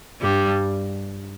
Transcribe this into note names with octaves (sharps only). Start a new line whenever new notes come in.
G2 G3